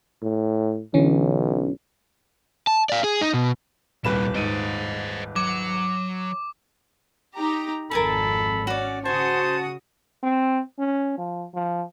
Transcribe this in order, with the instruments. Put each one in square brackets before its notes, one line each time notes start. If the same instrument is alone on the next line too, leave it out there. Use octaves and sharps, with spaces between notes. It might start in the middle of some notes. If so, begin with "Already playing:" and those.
[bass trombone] A2
[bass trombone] B1 [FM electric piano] D3 E3 C#4
[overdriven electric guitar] A5
D5 F5
G#4
D#4
B2
[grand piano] D#1 B4 E7 [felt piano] C2 [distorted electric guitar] A#2 G3
[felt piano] G#2 D#7 [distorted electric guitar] C5 D#5
[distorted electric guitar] F#3 [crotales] D6
[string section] D#4 G4 A#5
[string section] G#1 F2 [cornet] A4 [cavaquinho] A#4 G#5 A5 [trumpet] B5
[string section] C#4 [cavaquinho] F#4 D5
[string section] C#3 F#4 D#6 [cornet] C5 [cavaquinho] G#5 [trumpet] A5
[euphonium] C4
C#4
F3
F3